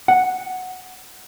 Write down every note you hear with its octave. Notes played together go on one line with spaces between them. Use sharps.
F#5